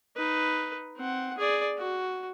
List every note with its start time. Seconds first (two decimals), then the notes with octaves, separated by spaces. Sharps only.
0.16 D#4 B4
0.97 C4 F#5
1.38 G#4 D5
1.78 F#4